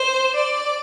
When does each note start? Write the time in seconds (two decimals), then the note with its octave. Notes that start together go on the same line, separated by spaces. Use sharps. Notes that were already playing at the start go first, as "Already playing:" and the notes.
Already playing: C5
0.36 D5